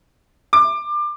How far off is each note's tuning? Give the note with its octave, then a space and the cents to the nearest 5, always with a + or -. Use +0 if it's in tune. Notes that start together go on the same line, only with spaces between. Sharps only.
D6 +25